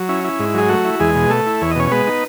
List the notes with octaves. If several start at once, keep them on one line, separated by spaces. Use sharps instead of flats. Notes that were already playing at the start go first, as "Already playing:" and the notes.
Already playing: F#3
C#4 E4
E4
G#2
F#3 G#4
A3 F#4
E4
E2 G#3 G#4
B2
A3 A4
E4
E2 C#5
D#5
B2 C#4 C#5
C#5
G#3 B3 B4
D#4